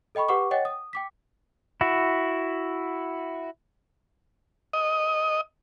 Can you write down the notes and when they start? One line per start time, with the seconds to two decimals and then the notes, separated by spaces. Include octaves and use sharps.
0.15 A4 D#5 G5 B5 C#6
0.28 G4 B4 F#5 C#6 D6
0.51 C#5 D#5 F#5 G5 A6
0.65 D#6
0.93 G5 D6 B6
1.81 E4 F#4
4.73 D#5